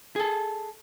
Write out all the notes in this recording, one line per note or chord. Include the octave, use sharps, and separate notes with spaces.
G#4 A4